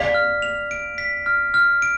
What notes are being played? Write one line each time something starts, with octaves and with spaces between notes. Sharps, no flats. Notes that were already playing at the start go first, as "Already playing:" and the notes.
Already playing: D5 F5 B6
F6
F7
D7
B6
F6
F6
D7